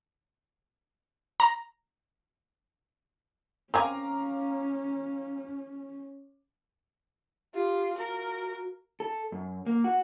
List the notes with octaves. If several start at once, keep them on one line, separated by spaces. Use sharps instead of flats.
A#5
C4 C#4 A#4 F5 G#5 A#5 D6
F4 G4
F#4 A#4
A4
F#2
A#3
F#4